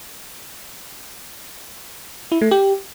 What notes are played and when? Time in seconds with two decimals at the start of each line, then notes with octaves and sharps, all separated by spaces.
2.32 E4
2.41 A3
2.51 G4